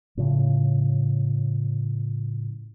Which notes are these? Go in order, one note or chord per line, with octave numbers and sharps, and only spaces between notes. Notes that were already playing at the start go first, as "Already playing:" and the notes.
A2 C#3 F3